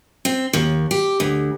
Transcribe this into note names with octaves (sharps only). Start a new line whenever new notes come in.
C4
D#2
G4
D2